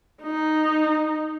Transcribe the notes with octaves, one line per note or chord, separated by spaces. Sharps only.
D#4